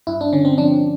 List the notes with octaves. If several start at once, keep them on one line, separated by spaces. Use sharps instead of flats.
G2 E4
D4
D3 C#4
C4
F3 D4